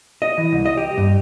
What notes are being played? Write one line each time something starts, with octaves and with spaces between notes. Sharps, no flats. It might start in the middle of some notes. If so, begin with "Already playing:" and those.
D#5
E3
C2
D#5
G4
G2